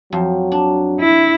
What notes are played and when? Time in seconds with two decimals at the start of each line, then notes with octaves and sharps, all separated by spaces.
0.12 F2 F#3
0.52 D4
1.00 E4